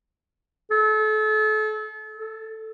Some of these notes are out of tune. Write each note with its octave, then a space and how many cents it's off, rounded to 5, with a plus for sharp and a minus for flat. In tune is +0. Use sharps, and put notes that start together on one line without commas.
A4 -35
A4 +5